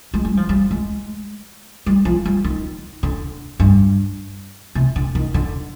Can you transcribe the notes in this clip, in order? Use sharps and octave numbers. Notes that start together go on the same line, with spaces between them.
G#3
G3
F3
G3
G#3
G3
F3
G3
D#3
D3
G2
C3
D3
D#3
D3